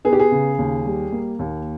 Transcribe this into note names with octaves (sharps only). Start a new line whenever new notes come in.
B3 G#4
G4
G#4
C#3
D#2
G3
A#3
D#2